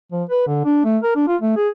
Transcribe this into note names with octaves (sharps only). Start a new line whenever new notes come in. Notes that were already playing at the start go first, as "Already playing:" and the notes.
F3
B4
D3
D4
A3
A#4
D4
F4
A3
G#4